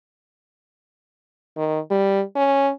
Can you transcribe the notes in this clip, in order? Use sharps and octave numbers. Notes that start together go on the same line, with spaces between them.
D#3
G3
C#4